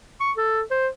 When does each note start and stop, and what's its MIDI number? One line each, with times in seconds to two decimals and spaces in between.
0.20 0.32 85
0.37 0.62 69
0.71 0.88 72